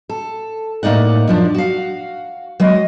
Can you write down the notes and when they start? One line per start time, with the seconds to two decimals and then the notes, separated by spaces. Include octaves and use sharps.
0.09 A4
0.83 A2 A#3 D#4 D5 F#5
1.27 F#2 F3 D4
1.54 F#4 F5
2.60 F#3 G#3 D#5